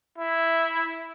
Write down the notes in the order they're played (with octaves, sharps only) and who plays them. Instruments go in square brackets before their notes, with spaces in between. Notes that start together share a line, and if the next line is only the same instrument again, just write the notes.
[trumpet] E4